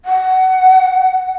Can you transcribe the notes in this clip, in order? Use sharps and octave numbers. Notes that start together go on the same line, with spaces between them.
F#5